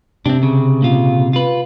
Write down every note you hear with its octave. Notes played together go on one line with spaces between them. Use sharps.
C3 C4 D4
C#3
A#2 C#3 F4
F4 B4